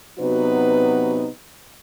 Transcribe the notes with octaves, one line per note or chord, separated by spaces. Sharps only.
C3 F#3 B3 D#4 F#4 B4